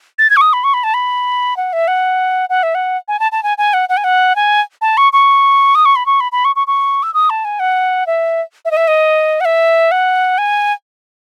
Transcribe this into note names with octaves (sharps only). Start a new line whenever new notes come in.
A6
G#6
C#6
D#6
B5
C#6
B5
A5
B5
F#5
E5
F#5
F#5
E5
F#5
G#5
A5
A5
G#5
G#5
F#5
F#5
G#5
F#5
G#5
A5
C#6
C#6
D#6
C#6
B5
C#6
B5
B5
C#6
C#6
C#6
E6
D#6
A5
G#5
F#5
E5
E5
D#5
E5
D#5
F#5
E5
F#5
G#5